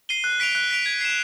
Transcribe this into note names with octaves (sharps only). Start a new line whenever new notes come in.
C7 D#7 G7
F#6
B6 D7 F7
F#6
B6 D7 F7
G#6
C7 E7